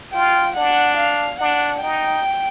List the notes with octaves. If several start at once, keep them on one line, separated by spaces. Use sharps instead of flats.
F4 G5
D4 F#5
F5
D4 F#5
D#4 G5